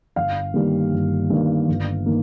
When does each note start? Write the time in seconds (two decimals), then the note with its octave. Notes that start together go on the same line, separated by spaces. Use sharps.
0.16 G1 F5
0.54 G2 D#3 G3 A#3
0.92 G1
1.30 G2 D#3 G3 A#3
1.69 G1
2.06 D#3 A#3